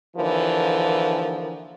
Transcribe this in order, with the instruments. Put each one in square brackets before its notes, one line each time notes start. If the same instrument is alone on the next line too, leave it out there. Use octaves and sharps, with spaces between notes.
[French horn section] D#2 D3 E3 F3 A#4